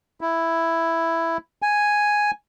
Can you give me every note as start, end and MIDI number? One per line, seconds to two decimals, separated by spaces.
0.21 1.37 64
1.62 2.31 80